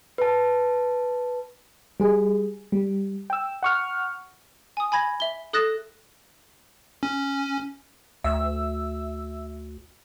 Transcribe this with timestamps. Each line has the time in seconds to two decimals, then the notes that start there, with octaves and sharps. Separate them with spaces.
0.18 B4 A5
2.00 G3 G#4
2.72 G3
3.30 G5 E6
3.63 F#5 C#6 F6
4.77 G#5 D#6
4.92 G#5 B5 G#6 A#6
5.20 E5 G7
5.53 A4 D#6 F#6 A6 A#6 E7
7.03 C#4
8.24 D2 E5 E6